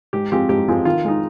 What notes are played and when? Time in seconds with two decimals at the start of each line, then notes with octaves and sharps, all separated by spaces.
0.13 G#2 G4
0.32 F3 G#3 C4 F4 G4
0.49 G#2 G4
0.68 F3 G#3 C4 F4
0.85 D#3 F4
1.05 G#3 D#4